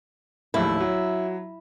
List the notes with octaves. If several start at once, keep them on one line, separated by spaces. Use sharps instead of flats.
A#1 D#2 A2 E4
F#3